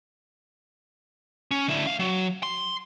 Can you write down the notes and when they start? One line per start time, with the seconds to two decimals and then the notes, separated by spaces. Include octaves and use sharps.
1.51 C#4
1.68 D3 E4
1.87 C#2 F5
2.00 F#3
2.43 C6